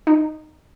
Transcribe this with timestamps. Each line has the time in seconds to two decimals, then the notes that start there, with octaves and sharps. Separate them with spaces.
0.07 D#4